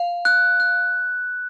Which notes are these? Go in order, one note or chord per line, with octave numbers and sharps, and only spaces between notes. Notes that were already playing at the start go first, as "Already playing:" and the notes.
Already playing: F5
F#6
F#6